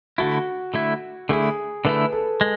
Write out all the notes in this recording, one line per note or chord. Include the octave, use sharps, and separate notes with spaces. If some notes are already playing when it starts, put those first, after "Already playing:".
D3 A3 E4 F#4
D3 A3 E4
D3 A3 E4 G#4
D3 A3 E4 B4
A4
G#3